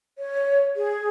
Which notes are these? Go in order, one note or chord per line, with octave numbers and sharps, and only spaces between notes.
C#5
G#4